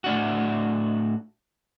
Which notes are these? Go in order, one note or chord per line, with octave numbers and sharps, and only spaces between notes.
A2 D4 F#4